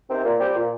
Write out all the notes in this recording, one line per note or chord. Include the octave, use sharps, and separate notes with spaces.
C3 D#3 C4
A#2
G3 C4 G4
A#2